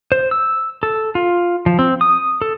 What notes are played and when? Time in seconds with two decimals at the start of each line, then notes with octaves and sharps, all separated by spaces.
0.12 C5
0.31 E6
0.83 A4
1.15 F4
1.66 F3
1.79 C4
2.01 D#6
2.42 A4